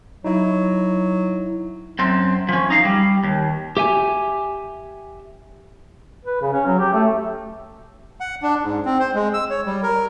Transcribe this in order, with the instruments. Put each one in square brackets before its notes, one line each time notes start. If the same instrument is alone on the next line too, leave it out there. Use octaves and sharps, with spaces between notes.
[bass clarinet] F#3 [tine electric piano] D#4 E4
[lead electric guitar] F#2 C4
F3 C#4
D#4 F5
G3
D#2
[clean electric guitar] G4 E5 G#5
[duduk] B4
C#3
C#4
F#3
G4
A3
[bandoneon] F#5
D4
G#2
C4
C5
G#3
E6
C#5
G3
A#4